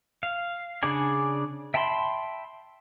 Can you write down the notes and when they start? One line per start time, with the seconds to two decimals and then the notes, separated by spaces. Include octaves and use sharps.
0.23 F5
0.83 C#3 D4 G#4 D5 G#5
1.74 E5 G5 A5 B5 C6